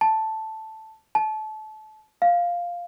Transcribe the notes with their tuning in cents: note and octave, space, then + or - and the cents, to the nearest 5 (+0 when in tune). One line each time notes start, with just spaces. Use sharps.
A5 +0
A5 -25
F5 +0